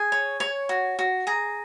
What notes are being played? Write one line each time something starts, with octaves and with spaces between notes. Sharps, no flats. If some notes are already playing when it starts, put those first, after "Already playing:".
Already playing: G#4 G#5
C#5
C#5
F#4
F#4
G#4 A#5